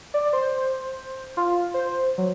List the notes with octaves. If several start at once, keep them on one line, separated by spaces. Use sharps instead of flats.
D5
C5
F4
C5
F#3